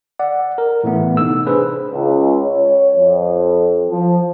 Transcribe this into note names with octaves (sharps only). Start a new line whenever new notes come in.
D5 F#5
A#4
A2 E3 A3 B3
C3 D#4 E6
D4 G#4 B4 C5
C#2
C#5
F2
F3